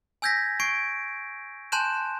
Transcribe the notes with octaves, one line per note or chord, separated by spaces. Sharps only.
G#5 E6 G6 G#6 A#6 B6
C#6 G#6 C7 D7
G#5 A5 C6 F#6 G6 E7